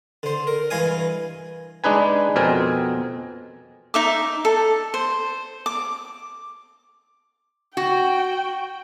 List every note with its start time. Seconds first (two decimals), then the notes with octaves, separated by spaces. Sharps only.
0.23 D3 C5
0.47 A#4
0.70 G2 E3 D#5 F5 G#5 D#6
1.84 G#3 D4 D#4 B4 G#5
2.36 F2 B2 C4 A#4 G#5
3.94 D#4 E5 D6
4.45 A4
4.94 C5
5.66 D6
7.77 F#4 G5